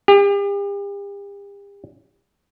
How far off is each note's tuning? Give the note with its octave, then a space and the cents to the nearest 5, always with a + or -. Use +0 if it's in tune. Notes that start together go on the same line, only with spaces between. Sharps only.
G4 +40